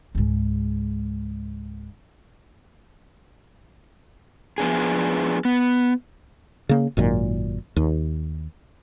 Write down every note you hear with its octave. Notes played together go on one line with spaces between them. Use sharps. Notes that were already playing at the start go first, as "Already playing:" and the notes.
C#2 G#2
F3 B3 D4 G#4
B3
C#3 A#3
G#1 F#2 A#2 D#3
D#2